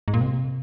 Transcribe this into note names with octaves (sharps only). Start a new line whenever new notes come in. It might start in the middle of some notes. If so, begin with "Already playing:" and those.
G#2
A#2
C3